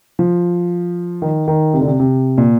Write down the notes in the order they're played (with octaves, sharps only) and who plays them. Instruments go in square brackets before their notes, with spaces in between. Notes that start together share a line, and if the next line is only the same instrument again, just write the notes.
[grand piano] F3
D#3
D#3
C3
D3
C3
C3
A#2